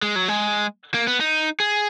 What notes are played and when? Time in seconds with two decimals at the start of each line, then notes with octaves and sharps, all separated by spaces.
0.02 G#3
0.16 F#3
0.28 G#3
0.94 A#3
1.07 B3
1.20 D#4
1.60 G#4